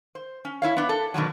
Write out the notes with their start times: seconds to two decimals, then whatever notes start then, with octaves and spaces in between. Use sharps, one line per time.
0.15 C5
0.45 C#4
0.62 E4 C#5 F5
0.77 B3 D4
0.89 A4
1.14 B2 D3 D#3 F#3